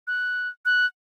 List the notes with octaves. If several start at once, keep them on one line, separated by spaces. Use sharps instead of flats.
F#6
F#6